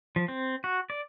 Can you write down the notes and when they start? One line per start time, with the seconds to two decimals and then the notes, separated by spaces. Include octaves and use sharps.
0.16 F3
0.28 C4
0.64 F#4
0.90 D5